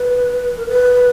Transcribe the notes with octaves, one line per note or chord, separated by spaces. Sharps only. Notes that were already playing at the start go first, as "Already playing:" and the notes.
Already playing: B4
A#4
B4